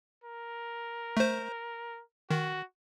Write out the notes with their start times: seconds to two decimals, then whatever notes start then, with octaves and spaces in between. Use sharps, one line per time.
0.24 A#4
1.17 A3 C5
2.31 D#3 F#4